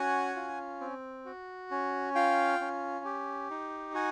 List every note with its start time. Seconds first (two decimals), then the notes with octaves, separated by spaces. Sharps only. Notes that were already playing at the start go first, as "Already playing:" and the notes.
Already playing: C#4 F#4 F#5 G#5
0.36 F4
0.81 C4
1.26 F#4
1.71 C#4
2.15 F4 F5 G5
2.61 C#4
3.05 G4
3.50 D#4
3.94 F#4 F#5 G#5